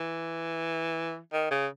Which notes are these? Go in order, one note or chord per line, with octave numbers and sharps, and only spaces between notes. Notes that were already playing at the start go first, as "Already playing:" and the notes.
Already playing: E3
D#3
C#3